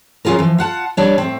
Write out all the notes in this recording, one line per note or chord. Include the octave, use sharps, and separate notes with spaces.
F#3 C#4 F4 G#4 A#4
E3 F3
F4 F#5 A5
G3 D4 C#5
A2 C4